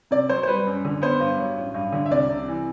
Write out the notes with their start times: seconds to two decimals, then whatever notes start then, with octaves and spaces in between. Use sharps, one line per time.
0.11 C3 D5
0.29 F#3 C5
0.43 C5
0.47 G3 B4
0.67 F#2
0.85 D3
1.02 B3 C5
1.20 G2
1.38 F#3
1.57 A1
1.74 G2
1.93 D3
2.06 E5
2.11 C2 D5
2.29 C3
2.48 E3